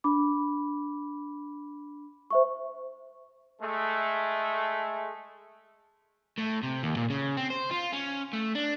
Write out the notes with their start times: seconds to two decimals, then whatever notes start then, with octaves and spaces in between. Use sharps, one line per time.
0.04 D4 B5 D6
2.30 C5 E5 C#6
3.62 G#3 A3
6.38 A2
6.63 C3
6.83 D#2
6.97 A#2
7.10 C#3
7.37 C4
7.50 C5
7.71 F4
7.92 C#4
8.33 A3
8.55 D4